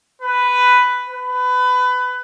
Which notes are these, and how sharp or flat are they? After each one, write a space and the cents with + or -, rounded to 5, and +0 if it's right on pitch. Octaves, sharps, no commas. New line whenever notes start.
B4 +5
B4 +20